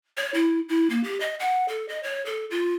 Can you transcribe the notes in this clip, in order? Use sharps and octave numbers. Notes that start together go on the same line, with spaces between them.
C#5
E4
E4
A#3
G4
D#5
F#5
A4
D#5
C#5
A4
F4